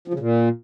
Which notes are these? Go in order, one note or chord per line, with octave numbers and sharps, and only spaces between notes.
F3
C#3
A#2